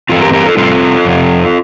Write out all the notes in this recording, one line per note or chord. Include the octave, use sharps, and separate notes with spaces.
G2 E3 A3 C4 F4 A4
G4 A#4
G4 A#4
F4 A4
C3 G3 C4 F4 A4
F2 C3 F3